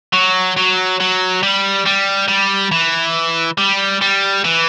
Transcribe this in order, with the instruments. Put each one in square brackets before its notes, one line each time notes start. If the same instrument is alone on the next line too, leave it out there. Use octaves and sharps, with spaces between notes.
[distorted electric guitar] F#3
F#3
F#3
G3
G3
G3
E3
G3
G3
E3